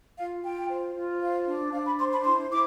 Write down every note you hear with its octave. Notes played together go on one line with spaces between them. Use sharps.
F4 F5
F4 G5
C5
F4
C5 F5
D4
D4 F5
B5
C5 C6
B5
E4 C6
E4 D6